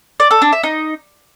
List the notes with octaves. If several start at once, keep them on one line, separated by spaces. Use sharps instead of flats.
D5
A4
D4
E5
D#4